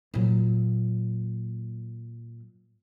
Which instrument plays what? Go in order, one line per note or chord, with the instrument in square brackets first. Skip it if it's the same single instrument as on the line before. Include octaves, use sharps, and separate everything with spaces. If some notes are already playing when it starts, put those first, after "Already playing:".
[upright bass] A#2 F#3